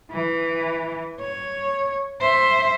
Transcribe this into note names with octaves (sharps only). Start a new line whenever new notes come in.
E3
C#5
C5 E5